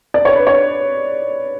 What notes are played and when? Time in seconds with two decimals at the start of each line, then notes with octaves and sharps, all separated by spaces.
0.14 D5
0.25 C#5
0.35 B4
0.47 C#5